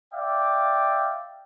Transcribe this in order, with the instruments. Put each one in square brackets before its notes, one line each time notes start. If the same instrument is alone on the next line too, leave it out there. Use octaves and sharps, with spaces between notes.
[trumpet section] D5 E5 F5 G5